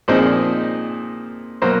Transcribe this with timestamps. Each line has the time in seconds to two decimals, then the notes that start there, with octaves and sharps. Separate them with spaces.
0.08 A#2 F3 G#3 C4 D#4 C5
1.62 B2 F#3 A#3 C5